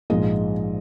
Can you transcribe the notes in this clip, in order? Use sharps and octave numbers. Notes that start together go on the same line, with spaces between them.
A#1 G#2 F3 G#3 D#5